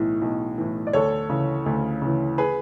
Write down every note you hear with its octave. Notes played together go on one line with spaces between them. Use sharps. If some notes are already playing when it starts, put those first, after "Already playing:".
Already playing: B1 A2 E3
B1
A2 E3
D5
D2 A4 C#5
C#3 E3
D2
C#3 E3
G#4 B4